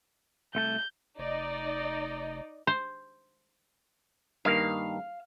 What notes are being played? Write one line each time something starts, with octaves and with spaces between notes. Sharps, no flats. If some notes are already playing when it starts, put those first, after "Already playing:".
C2 A3 A5 G6
F1 D#4 D5 D#5
C5
G2 D#3 A#3 F5